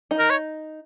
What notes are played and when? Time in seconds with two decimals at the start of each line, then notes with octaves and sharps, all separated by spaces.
0.11 D#4
0.19 A#4
0.30 C#5